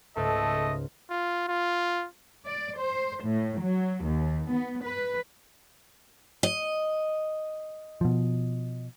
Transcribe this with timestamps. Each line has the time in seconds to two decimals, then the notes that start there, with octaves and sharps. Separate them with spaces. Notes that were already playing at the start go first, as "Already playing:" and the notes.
0.17 C#2 G#2 A3 A4 D#5 C6
1.10 F4
1.48 F4
2.47 D5
2.79 C5
3.25 A2
3.61 F#3
4.06 D#2
4.51 B3
4.85 B4
6.43 D#5
8.01 B2 F3